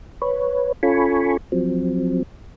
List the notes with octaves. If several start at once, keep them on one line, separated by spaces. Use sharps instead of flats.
B4 C#5
C#4 F4 A4 G#5 B5 C#6
F3 F#3 C4